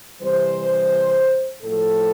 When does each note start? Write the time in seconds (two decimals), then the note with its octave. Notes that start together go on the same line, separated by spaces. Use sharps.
0.20 C3 E3 G3 C5
1.63 A2 F3 A3 A4